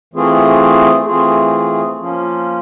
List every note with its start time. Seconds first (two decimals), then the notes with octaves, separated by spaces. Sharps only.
0.13 E3 A3 C4 F4 G#4
1.07 E3 A3 C4 F4 G#4
1.99 F3 A#3 C#4 F4